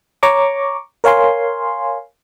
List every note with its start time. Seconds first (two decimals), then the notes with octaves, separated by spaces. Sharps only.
0.23 C#5 A#5 C#6 D6
1.04 A#4 C#5 F5 G#5 C6